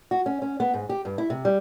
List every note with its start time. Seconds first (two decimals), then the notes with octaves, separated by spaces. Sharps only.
0.11 F#4
0.26 C#4
0.42 C#4
0.60 B3
0.74 G#2
0.89 G4
1.05 G2
1.18 E4
1.30 C3
1.45 G3